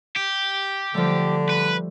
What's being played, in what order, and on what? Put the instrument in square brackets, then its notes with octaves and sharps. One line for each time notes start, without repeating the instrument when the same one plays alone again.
[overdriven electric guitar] G4
[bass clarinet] D3 [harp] F3 G3 A3
[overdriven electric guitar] B4